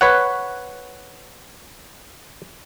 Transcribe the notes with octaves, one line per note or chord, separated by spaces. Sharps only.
B4 C#5 F#5